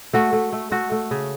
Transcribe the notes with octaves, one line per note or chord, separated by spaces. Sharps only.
A3 F#4
A3
A3
A3 F#4
A3
C#3